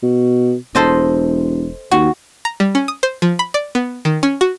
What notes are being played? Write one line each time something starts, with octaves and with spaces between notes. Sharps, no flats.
B2
E1 A4 C5 D#5
D#2 F#4
A#5
G3
C#4
D#6
C5
F3
B5
D5
B3
D#3
C#4
F#4